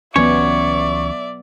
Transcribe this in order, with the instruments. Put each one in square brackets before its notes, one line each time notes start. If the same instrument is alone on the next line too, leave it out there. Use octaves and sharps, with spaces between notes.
[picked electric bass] C#2 E3 C#4 [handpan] F#3 B3 [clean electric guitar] C#5 [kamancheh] D5 E5